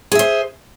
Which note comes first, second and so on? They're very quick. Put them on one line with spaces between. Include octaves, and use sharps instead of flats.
G#4 E5 C5